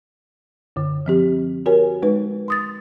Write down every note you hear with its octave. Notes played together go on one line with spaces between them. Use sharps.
F#2 D3
F3 C4 G4
F#4 G4 A#4 C#5 G#5
G#3 D#4 B4
C6 D#6 A6